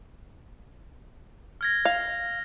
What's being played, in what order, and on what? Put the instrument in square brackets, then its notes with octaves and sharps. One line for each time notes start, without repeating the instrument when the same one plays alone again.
[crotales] F6 G#6 A#6
[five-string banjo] F5